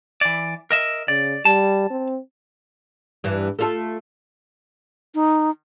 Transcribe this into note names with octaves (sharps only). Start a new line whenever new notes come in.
E3 D5
A#4 D#5 E5
C#3 D5
G3 A5
C4
G2 E3
A3 F4 A4
D#4